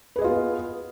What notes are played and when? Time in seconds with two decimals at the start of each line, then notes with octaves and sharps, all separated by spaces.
0.16 B4
0.19 G#4
0.21 D#5
0.24 F4
0.27 B3